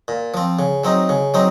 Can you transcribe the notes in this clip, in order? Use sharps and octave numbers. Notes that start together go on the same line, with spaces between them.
A#2
F3 C4
C#3
F#3 C4 D#4
C#3
F#3 C4 D#4